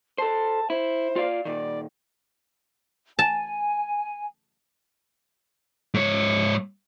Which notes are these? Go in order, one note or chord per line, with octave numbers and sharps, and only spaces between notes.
A4 C5 A5
E4 C5
F4 D5 F5
A#2 D#3 D5
G#5 A5
G#2 C#5